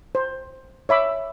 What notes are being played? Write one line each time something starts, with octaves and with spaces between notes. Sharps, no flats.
C5
C#5 E5 B5 D6